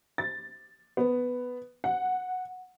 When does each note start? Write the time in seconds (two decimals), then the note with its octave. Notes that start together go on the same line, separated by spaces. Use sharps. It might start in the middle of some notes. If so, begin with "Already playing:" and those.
0.18 A6
0.97 B3
1.84 F#5